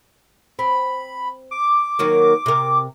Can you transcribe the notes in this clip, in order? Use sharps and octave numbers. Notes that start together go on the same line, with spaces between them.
C4 B5
D6
D#3 F#3 A#3
C3 A#4